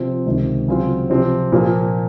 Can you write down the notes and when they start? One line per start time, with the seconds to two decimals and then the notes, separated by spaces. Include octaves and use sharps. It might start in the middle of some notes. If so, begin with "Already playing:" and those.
Already playing: C3 F3 C4 F4
0.26 C#2 C3 D#3
0.68 C#3 F#3 C4 F4
1.10 C3 F3 C4
1.52 A#2 F3 A#3 F4